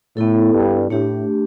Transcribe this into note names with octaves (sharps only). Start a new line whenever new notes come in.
A2 B3 E4 A4
G2
A2 A3 D4 G4